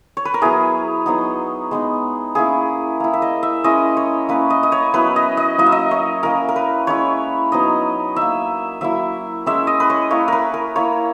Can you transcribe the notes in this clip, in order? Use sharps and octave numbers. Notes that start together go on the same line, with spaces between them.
C#5
B4
A#4
F#3 B3 E4 G#4
F#3 B3 D#4
G#3 B3 D#4
A#3 C#4 E4 G#4
A#3 E4
E5
D#5
E5
G#3 C#4 E4 D#5
C#5
A#3 C#4 E4 B4
D#5
D#5
C#5
F#3 B3 E4 B4
D#5
D#5
F#3 A#3 E4 D#5
E5
D#5
C#5
A#3 C#4 E4 A#4
A#4
B4
G#3 C#4 E4 C#5
F#3 B3 D#4 D#5
D#4 E5
A#3
F#3 A#3 E4 E5
G#3 C#4 E4 E5
D#5
B4
C#5
A#3 E4 C#5
A#4 B4
A#4
A#3 E4 C#5